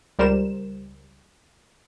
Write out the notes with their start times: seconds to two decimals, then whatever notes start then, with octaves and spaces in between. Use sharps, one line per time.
0.19 C#2 G3 A#4 C5 E7